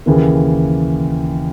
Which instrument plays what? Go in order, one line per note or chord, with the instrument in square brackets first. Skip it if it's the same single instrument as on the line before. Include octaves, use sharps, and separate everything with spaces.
[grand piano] D#2 C#3 E3 A#3